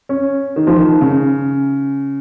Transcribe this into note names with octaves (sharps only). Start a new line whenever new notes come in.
C#4
D#3
F3
D#3
C#3